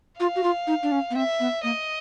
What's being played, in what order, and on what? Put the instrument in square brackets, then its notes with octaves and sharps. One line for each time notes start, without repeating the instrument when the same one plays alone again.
[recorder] F4 [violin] F5
[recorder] F#4
F4
D#4
D4
C#4
B3
[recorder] C4 [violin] E5
[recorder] B3
[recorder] A#3 [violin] D#5